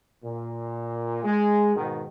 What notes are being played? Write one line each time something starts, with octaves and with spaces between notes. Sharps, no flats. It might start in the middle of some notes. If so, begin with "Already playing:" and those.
A#2
G#3
G#2 B2 D#3